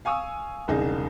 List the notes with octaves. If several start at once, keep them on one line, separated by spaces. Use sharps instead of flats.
F5 G#5 C#6 D#6 E6
E1 C2 C#3 D#4 G#4